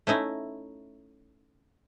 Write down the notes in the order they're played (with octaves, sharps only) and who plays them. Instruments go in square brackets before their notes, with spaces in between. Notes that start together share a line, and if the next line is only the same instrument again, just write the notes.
[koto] A3 C#4 D#4 E4